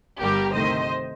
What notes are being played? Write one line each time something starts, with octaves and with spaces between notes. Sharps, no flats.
G1 G2 D3 G3 G4 A#4
C2 C3 D#3 A3 C5 D#5